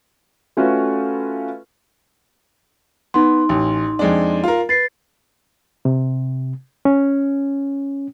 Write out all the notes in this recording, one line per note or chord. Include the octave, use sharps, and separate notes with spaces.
A3 C#4 F4 F#4 B4
B3 D#4 C6
A1
F2 G#3 D4
F4 A#4
B4 A6 C7
C3
C#4